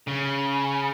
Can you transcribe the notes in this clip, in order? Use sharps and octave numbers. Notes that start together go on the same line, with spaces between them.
C#3